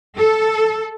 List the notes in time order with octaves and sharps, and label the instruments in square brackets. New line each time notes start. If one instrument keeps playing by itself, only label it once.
[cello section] A4